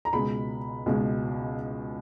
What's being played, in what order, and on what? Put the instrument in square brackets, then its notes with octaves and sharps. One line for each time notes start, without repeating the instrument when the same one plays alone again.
[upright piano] A#5
C#2 B2 G#3 B5
C#2 B2 G#3